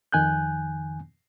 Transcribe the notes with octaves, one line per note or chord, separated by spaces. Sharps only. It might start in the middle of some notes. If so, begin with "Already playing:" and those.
F2 D#3 G#5 F#6 G6